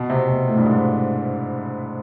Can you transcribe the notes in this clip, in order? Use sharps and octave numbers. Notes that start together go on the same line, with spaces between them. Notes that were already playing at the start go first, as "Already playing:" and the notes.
Already playing: B2
C3
B2
A2
G2
G#2